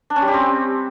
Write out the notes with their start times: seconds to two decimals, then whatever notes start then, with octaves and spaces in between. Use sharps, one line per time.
0.10 D4
0.16 C#4
0.22 G3
0.28 G4
0.34 C4